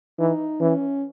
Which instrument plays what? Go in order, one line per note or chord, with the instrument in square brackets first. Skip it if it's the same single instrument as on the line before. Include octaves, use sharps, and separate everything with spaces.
[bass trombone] E3 [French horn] D#4
[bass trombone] E3 [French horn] C#4